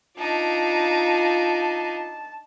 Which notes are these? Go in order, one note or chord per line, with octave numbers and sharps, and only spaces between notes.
D4 D#4 F4 A5